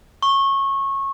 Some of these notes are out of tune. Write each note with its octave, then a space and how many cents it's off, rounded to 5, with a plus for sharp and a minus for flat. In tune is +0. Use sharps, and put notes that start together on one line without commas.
C#6 -20